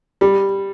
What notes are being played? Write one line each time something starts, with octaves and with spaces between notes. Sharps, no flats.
G3